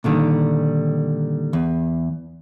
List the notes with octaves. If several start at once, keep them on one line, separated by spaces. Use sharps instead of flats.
A#2 D3 D#3 G3
E2